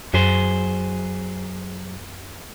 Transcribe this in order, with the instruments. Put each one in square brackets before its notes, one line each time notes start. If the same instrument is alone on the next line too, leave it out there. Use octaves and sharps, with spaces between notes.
[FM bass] F#2 [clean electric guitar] F#3 G#4 C5